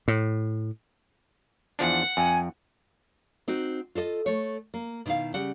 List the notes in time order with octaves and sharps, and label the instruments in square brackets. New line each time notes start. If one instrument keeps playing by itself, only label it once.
[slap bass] A2
[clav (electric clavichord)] E2 F3 D4 [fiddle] F#5
[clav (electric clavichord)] F2 [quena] G#5
[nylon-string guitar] C4 D#4 F#4
F4 A4 C#5 D#5
A3 C#5
A#3
B2 D#3 D#4 E4 F5
C#3 G3 F#5